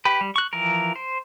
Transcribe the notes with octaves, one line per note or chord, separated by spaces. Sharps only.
G4 B4
G3
C#6 F#6
E3 F3 A#4
C5